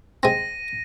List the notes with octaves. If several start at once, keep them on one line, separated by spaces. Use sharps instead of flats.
G#3 C4 A#6 D#7